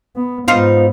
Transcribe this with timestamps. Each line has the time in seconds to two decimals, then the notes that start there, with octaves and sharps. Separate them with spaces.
0.16 B3
0.48 G#2 B3 D#4 F4 C5